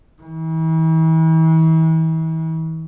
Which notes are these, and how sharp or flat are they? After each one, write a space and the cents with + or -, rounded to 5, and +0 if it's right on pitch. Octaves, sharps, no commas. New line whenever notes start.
E3 -40